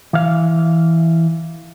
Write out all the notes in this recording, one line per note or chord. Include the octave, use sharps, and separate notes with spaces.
E3 F5